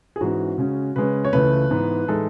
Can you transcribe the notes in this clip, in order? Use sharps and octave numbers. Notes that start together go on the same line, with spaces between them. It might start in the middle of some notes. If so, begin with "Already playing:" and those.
G#4
G#2 E3 G#3 C#4 F#4
C#3 G#3 C#4
C#3 G#3 C#4 B4
C#5
C#2 C#3 E3 A3 B4
G#2 E3 B3
A2 E3 G#3 D#4 A4